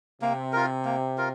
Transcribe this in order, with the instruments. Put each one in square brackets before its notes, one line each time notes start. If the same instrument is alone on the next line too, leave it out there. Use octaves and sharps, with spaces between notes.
[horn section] C3 [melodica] A#3
[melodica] F4 A#4
A#3
F4 A#4